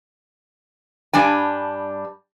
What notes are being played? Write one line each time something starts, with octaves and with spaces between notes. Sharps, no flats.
G2 G3 D4 G#5